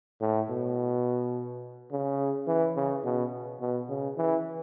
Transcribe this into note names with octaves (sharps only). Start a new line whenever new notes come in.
A2
B2
C#3
E3
C#3
B2
B2
C#3
E3